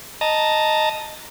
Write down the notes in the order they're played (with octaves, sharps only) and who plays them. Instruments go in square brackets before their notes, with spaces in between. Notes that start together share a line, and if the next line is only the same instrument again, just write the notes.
[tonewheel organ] D#5 A5 A#5